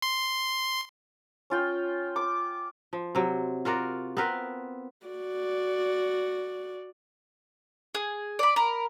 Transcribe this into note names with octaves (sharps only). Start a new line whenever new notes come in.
C6
C#4 F4 G5
D6
F3
C3 F#3
F4 F#4 A#4 D5
B3 C4 A#4 B4
F#4 D5
G#4
D5 B5
A#4 B5